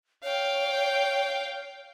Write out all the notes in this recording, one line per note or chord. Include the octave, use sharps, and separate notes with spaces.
C#5 F5 G5